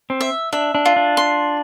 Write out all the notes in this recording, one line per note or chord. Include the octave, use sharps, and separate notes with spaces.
C4
E5
D4 E5
D4
F4
D4
C6